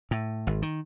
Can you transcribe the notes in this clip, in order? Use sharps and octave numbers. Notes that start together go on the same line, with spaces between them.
A2
G#1
D#3